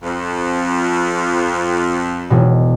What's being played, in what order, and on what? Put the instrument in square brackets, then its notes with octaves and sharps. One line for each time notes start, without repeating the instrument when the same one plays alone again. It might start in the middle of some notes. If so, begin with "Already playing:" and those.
[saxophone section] F2
[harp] E1 B2